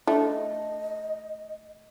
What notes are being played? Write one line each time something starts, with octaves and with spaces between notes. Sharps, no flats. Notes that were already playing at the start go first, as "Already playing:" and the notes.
A3 D4 E4 D#5